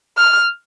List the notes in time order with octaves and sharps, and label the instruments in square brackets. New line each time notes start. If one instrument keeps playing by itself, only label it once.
[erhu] F6